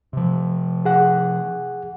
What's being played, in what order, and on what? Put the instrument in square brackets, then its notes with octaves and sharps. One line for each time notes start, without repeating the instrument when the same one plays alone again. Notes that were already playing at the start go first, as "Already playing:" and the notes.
[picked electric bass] C3 F3
[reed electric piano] G#4 F#5